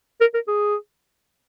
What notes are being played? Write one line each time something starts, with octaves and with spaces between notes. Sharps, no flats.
A#4
A#4
G#4